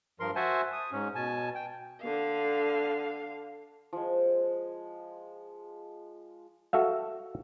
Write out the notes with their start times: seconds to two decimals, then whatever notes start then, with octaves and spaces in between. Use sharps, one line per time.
0.20 G2 F3 A#4 C6
0.36 F#4 C5 E5 F#5 G#5 A5
0.73 D#6
0.92 G#2 C#4
1.15 B2 G#5 A5
1.55 G5
2.01 D3 F5
3.93 F3 G#3
6.73 F#4 A4 E5 F5